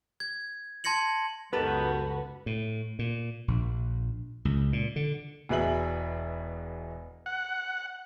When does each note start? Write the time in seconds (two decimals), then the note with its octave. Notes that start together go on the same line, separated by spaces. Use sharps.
0.20 G#6
0.84 A5 C6 G#6 A#6 C#7 F#7
1.53 C#2 F#2 D#3 B3 F#4 G4 A4 B4
2.46 A2
2.99 A#2
3.48 A#1
4.45 C#2
4.73 A#2
4.96 D3
5.49 E1 B2 G#4 B4 E5 F#7
7.26 F#5